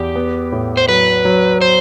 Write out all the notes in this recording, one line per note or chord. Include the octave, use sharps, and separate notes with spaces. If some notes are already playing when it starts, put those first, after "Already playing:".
Already playing: E2 G4
B3
A2
C5
F#3 B4
F#3
C5